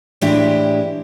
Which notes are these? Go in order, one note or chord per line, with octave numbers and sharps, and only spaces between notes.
A2 E3 G#3 D4 E4 G4